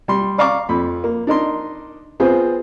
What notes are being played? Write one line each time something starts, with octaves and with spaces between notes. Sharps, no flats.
G3 C6
D5 F5 A#5 C#6 D6
F2 B5
A#3
D4 D#4 A#4 C6
B3 C4 F4 G#4 C5